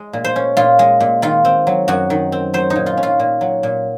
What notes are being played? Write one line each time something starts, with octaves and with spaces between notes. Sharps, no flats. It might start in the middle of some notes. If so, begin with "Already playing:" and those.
Already playing: G#3
A#2
C5
C#4
A#2 F4
G#3
A#2
D#3 F4
C4
F#3
F#2 F#4
D#3
C4
F#3 C5
D#4
A#2
F4
C#4
F4
A#2
F#3
A#2